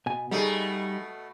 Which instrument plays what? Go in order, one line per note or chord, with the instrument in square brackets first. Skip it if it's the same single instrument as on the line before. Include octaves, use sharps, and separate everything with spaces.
[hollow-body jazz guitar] B2 G#5
[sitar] B2 A3 [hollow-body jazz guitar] G3 D#4 G#4